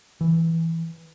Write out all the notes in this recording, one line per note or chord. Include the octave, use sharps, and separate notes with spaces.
E3